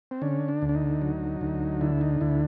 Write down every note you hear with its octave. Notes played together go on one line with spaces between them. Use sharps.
C4
D3 C#4
D4
D2
D4
D#4
F#3
D2
D3 E4
D#4
D2 E4